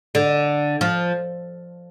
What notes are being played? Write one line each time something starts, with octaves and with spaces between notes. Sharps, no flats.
D3
F3